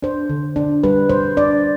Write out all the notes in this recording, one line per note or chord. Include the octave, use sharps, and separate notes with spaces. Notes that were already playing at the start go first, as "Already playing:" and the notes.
D4 C5
D3
D4
G3 B4
G3 C5
D4 D5